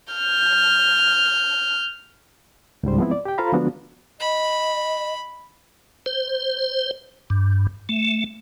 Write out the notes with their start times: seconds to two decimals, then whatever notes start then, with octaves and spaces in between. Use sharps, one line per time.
0.14 F6 G6
2.83 C#2 G#2 G3 C5
2.98 F3 G#3 B3 C4 E4
3.11 D5
3.25 G4 G5
3.38 F4 A4 C5 F5 A#5 B5
3.52 D3 F3 G#3 B3 D4 F#4
4.20 D#5 B5
6.06 C5
7.30 G2
7.89 A3